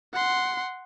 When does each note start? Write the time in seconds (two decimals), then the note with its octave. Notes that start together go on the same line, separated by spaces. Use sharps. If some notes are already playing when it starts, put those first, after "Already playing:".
0.13 F#5 C6